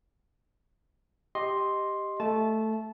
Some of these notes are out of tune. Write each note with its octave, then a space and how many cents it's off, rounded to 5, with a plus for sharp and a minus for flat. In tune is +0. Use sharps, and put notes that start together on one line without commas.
G4 +0 D#5 +0 C6 +5
A3 +0 A5 -20